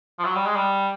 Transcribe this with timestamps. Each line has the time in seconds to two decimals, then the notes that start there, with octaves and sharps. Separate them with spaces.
0.19 F3
0.25 F#3
0.36 G3
0.46 G#3
0.56 G3